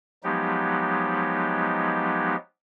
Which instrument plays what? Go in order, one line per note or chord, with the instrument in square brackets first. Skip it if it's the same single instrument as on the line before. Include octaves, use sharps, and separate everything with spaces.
[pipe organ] F3 F#3 G#3 B3 D#4 G4